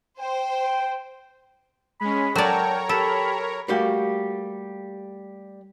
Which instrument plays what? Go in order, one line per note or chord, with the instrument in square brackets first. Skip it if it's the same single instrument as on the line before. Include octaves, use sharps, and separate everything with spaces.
[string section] C5 [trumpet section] G5
[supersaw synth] G#3 C#4 [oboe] B5
[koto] F#3 D5 [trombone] A4 [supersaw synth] A#4 C#5 A#5 [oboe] G5
[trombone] G4 [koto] A4 [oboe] B5
[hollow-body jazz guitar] G3 A3 A#3 F#4 G4